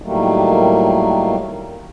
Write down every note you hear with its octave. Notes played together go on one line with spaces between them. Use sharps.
A2 D#3 F#3 G3 A3 A#3